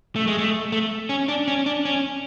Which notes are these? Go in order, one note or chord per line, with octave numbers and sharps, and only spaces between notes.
A3
G#3
A3
A3
C#4
D4
C#4
D4
C#4